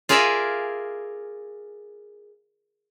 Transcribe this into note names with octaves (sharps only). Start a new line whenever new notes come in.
F4 G#4 A#4 D5 E5 G#5